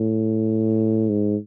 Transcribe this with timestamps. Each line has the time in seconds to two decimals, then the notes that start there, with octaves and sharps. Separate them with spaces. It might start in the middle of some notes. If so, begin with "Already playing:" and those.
Already playing: A2
1.09 G#2